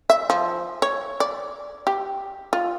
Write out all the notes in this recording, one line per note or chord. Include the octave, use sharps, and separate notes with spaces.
E5
F3
C#5
D5
G4
F4